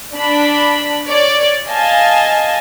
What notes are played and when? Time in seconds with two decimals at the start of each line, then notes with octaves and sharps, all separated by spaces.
0.15 D4 B5
1.08 C#5 D5
1.68 D#5 F5 G#5 A5